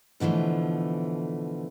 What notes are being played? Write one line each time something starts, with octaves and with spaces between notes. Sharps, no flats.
B2 D3 E3 F3 A3